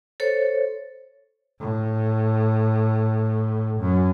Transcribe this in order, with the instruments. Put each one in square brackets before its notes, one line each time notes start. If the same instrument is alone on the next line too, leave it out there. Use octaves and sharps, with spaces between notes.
[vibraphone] A4 C5 C#5
[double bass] A2
F#2